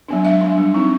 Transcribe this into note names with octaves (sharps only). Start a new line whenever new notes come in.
F#3 B3 D4
G#3 E5
B3 D4
G3
C4 D#4